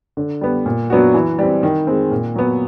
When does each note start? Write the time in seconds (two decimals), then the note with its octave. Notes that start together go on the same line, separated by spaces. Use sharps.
0.17 D3
0.41 G3 B3
0.66 A#2
0.90 F#3 B3 D4 F#4
1.14 E3
1.39 G3 C4
1.63 D#3
1.87 G#3 C4
2.11 A#2
2.36 F#3 B3